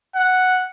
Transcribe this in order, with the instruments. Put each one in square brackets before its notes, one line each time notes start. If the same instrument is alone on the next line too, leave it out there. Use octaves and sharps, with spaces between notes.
[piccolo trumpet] F#5